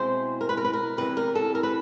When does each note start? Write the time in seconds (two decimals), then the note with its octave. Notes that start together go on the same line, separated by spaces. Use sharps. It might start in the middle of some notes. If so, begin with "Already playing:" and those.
Already playing: B2 G#3 C4 E4 C5
0.41 A#4
0.49 B4
0.57 A#4
0.64 B4
0.73 A#4
0.97 E2 C3 E3 G3 B4
1.17 A#4
1.35 A4
1.55 A#4
1.63 B4